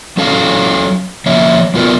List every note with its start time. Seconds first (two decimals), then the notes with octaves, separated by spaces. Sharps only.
0.17 F#3 C#4 A4 C#5 F5
1.26 F3 A#3 C#5 E5
1.74 F#3 B3 F4 A#4 B4 D5